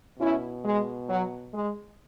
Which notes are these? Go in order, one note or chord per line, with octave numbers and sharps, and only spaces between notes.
B2 C#4 E4
G#3
F#3
G#3